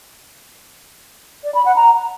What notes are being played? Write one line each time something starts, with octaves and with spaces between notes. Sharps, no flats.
D5
B5
F#5
A#5